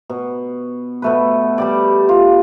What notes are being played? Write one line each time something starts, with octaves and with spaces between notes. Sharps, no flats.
B2
B2 A3 B4
G3 G4 D5
F4